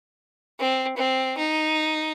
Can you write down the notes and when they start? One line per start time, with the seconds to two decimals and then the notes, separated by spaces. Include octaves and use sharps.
0.60 C4
0.97 C4
1.38 D#4